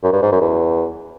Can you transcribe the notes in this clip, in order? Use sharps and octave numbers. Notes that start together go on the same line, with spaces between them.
F#2
G2
G#2
F#2
E2